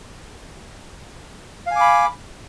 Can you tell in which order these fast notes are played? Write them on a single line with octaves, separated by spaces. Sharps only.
F5 G#5 D6 B5